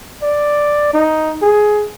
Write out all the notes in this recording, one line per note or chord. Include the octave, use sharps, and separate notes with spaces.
D5
D#4
G#4